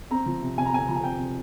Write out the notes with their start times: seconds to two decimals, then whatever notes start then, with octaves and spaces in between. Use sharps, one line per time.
0.11 C4 A#5
0.26 F3
0.42 C3
0.58 C3 G#5
0.66 A#5
0.73 C4 G#5
0.88 F3 A#5
0.96 G#5
1.04 C3 G5
1.19 C3